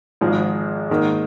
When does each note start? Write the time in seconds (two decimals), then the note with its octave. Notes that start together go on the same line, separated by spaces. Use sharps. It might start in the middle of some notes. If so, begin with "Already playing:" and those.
0.21 G#1 G#2 F3 G#3
0.90 G#2 D#3 A#3